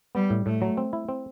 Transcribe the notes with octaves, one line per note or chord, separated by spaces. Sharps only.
G3 B3
A2
A2 A3
F#3
C4
E4
C4